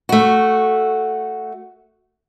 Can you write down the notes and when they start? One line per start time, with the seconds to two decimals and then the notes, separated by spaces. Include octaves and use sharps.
0.09 A3 F#4